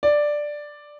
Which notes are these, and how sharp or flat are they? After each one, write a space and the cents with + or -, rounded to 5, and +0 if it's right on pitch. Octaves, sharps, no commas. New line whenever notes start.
D5 +5